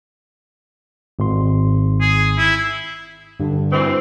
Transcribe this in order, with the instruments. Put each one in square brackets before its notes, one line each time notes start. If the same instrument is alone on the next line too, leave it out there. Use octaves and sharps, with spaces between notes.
[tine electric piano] G#1 C6
[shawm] G#4
E4
[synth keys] G2 [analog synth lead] D3
[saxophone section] D2 E3 C4